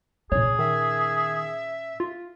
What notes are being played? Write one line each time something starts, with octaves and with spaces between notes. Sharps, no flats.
A#2 C#4 G#4 C#5
D#3 E5
F4